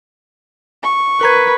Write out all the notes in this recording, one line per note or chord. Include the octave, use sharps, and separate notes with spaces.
C#6
A#4 B4 A#5 G#6